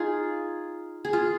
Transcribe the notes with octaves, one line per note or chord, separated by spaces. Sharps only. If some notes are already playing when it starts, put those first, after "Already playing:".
Already playing: D#4 F4 G#4
G#4
F4